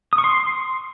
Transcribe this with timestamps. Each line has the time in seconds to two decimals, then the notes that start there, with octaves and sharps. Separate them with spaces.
0.13 D#6
0.18 C#6
0.24 C6